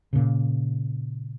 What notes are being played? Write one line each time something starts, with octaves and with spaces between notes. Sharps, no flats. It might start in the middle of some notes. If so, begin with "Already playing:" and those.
A#2 C#3